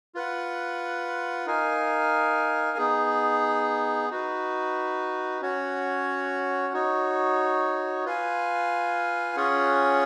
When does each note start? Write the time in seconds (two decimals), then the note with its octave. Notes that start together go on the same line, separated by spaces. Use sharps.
0.15 F4 B4 F#5
1.46 D#4 A#4 F5 G#5
2.77 B3 D#4 G#4
4.10 D#4 F#4 B4
5.42 C#4 F#4 C#5 F#5
6.73 D#4 F#4 C#5
8.05 F4 B4 F5 G#5
9.36 C#4 F4 G#4 C#5 F#5